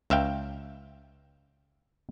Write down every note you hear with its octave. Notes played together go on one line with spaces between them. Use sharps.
C#2 E5 F5 G5